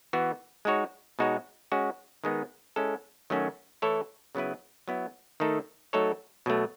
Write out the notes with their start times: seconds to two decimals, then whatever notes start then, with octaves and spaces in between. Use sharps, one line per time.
0.13 E3 B3 F#4
0.65 G#3 D#4 F#4 C#5
1.19 B2 G#3 D#4 F#4 C#5
1.72 G#3 C#4 F#4
2.24 D#3 G#3 B3 D#4
2.76 G#3 C#4 E4 A4
3.30 D#3 F#3 A3 C#4 F#4
3.82 E3 A3 E4 A4 C#5
4.35 C#3 F#3 B3 E4 B4
4.88 F#3 B3 E4
5.40 D#3 A3 D#4 A4
5.93 F#3 A3 D#4 A4 C#5
6.46 B2 F#3 A3